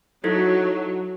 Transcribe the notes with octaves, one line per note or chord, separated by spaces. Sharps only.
F#3 D#4 E4 A4 C#5